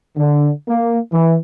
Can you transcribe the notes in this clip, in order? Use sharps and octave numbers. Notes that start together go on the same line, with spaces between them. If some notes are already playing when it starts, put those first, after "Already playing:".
D3
A#3
E3